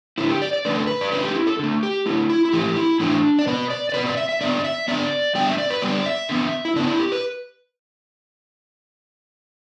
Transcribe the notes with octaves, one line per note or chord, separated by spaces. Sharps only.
D3 A3 E4
G4
D5
D5
D3 A3 B4
A4
B4
D5
D3 A3 B4
G4
D4
E4
A4
D3 A3
G4
D3 A3 E4
E4
E4
A2 E3 A3 G4
E4
A2 E3 A3 D4
D5
B2 B3 B4
D5
D5
B2 B3 B4
D5
E5
E5
D3 B3 D5
E5
D3 B3 D5
D3 G3 B3 G5
E5
D5
B4
D3 G3 B3 D5
E5
D3 B3
E4
D3 B3 D4
E4
G4
B4